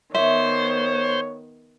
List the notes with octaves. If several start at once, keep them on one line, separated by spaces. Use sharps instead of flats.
D#3 B3 C5 C#5 E5